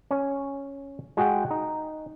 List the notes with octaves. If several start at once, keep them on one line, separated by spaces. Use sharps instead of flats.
C#4 C#5
G#3 F#4 G#4 F#5 G5
D#4